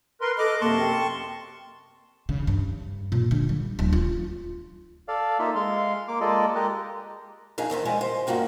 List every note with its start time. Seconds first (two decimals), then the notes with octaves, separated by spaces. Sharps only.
0.21 A#4 B4 C6
0.38 A4 D#5 D6 F6 F#6
0.61 F#2 C3 A#3 A5 C6 C#6
0.78 G5
2.29 C#3
2.47 G2
3.12 A#2
3.31 D3
3.49 G3
3.79 D1
3.93 F4
5.08 A4 D5 F5
5.39 A#3 D#4 F4 E5
5.55 G#3 F5 C6
6.08 A#3 D6
6.21 G#3 A#3 F4 A4 D5 D#5
6.55 G#3 G4 A#4 D#5 F#6
7.58 F2 D4 D#4 G#4 F5
7.70 E2 D#3 E3 C5
7.85 F2 G3 G#3 B3 D#5 G#5
8.01 C5
8.27 G2 A#3 F4 F#4 G5